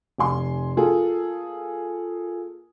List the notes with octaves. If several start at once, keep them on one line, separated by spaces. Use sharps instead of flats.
F1 G#5 C6
A#3 F4 G#4 A4